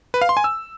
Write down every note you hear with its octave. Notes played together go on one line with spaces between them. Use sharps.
B4
F5
C6
G#5
E6